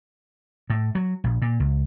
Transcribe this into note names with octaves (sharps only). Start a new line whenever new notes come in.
A2
F#3
A#1
A#2
C#2